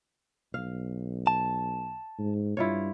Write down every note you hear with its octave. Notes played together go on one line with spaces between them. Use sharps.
B1 F5
A5
G#2
G2 E4 F4 C#5